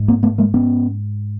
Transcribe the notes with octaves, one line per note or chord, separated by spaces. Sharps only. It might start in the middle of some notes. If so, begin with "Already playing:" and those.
Already playing: G#2
A#3 C4
A3 B3
G#3 A#3
B3 C#4